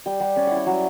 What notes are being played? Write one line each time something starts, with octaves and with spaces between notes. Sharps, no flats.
G3 G5
G3 F#5
C#4 D5
E4 F#5
G5
F#3